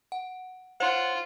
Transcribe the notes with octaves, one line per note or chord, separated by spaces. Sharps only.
F#5
F4 C5 C#5 F#5